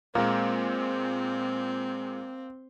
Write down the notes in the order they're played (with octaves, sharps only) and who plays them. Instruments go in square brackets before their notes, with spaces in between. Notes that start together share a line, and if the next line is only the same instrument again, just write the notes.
[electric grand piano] A#2 G#3 [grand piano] A#3 [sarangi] C4